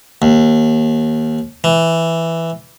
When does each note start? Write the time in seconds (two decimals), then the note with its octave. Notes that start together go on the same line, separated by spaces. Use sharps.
0.22 D#2
1.64 E3